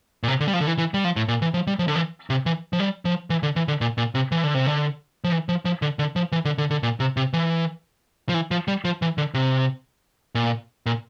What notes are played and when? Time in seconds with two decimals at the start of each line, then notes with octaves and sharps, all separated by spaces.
0.23 A#2
0.28 C3
0.40 D3
0.48 G3
0.53 F3
0.61 D3
0.67 E3
0.78 E3
0.94 G3
1.04 F3
1.16 A2
1.28 A#2
1.42 E3
1.54 F3
1.67 G3
1.79 F3
1.88 D3
1.96 E3
2.30 C3
2.46 E3
2.73 F3
2.80 G3
3.05 F3
3.30 E3
3.43 D3
3.56 E3
3.68 D3
3.81 A#2
3.98 A#2
4.15 C3
4.32 E3
4.43 D3
4.54 C3
4.67 D3
5.24 F3
5.32 E3
5.49 F3
5.65 F3
5.82 D3
5.99 D3
6.16 F3
6.32 E3
6.45 D3
6.58 D3
6.71 D3
6.83 A#2
7.00 C3
7.17 C3
7.33 E3
8.29 F3
8.34 E3
8.51 F3
8.68 G3
8.85 F3
9.02 E3
9.18 D3
9.34 C3
10.35 A#2
10.86 A#2